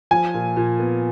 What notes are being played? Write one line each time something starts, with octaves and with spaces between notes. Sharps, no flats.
F3 G#5
A#2
A#2
B3